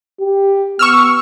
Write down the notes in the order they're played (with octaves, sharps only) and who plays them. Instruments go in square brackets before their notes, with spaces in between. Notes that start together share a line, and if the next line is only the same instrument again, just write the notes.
[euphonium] G4
[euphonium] B3 [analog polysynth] C#6 E6 F6